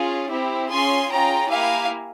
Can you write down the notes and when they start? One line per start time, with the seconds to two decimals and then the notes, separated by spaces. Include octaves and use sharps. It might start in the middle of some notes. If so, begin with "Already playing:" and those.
Already playing: C#4 F4 G#4
0.30 C4 E4 G4
0.70 C#4 F4 G#4 G#5 C6
1.10 C#4 F4 G#4 G5 A#5
1.49 A#3 E4 G4 F5 G#5